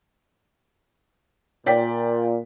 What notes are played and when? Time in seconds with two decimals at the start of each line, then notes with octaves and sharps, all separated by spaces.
1.66 A#2 D5 G5 B6